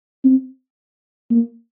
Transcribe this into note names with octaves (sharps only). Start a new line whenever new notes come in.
C4
A#3